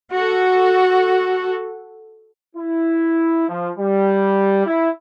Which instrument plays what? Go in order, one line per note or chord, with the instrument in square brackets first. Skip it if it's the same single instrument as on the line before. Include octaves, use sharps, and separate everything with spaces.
[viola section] F#4 A4
[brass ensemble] E4
F3
G3
E4